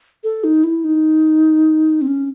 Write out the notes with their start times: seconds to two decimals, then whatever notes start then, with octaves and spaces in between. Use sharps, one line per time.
0.24 A4
0.44 D#4
0.64 E4
0.84 D#4
2.02 C4
2.07 C#4